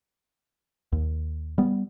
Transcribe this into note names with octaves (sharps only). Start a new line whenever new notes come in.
D#2
G3 B3